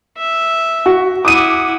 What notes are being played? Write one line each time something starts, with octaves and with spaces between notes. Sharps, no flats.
E5
F#4
E4 F#5 D6 D#6 D#7